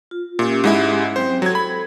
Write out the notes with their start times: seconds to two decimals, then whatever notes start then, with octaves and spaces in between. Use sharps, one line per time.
0.11 F4
0.39 A#2 C#4 G4 E5
0.64 G#2 G#3 E4
1.16 F#3 C4 C5 G5
1.42 F#3 A4 G#6
1.55 B5